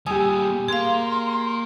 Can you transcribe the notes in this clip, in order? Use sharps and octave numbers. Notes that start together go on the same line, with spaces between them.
A#2 G3 G4 G#5 D#6 E6
A#3 G#4 F5 C6